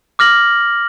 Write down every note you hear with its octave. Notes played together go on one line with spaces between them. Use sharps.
D6 F6 A#6 F#7